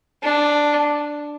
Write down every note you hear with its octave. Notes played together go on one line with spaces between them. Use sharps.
D4